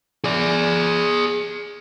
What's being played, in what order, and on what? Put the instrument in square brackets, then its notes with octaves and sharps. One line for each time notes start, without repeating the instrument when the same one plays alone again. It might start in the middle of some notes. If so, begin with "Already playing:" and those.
[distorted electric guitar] G#4 D5